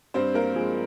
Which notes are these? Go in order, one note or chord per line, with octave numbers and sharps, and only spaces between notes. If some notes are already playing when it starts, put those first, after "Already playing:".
G2 C4 C5
A#3 A#4
F3 G#3 G#4